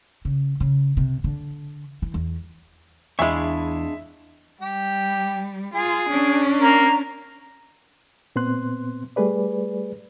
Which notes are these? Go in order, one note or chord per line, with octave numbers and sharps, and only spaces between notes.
C#3
C#3
C3
D3
E3
E2
E2 G#3 D4 E4 E5 F5 G#5 C#6
G3 G4
F4 G#4
C#4 D4
A#3 A#5
A#2 B3 C4 C6 F#6
G3 A3 G#4 B4 D5